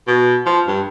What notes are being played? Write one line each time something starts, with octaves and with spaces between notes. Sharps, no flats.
B2
F3
G2